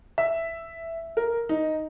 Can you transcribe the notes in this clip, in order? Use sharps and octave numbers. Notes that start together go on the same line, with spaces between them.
E5
A#4
D#4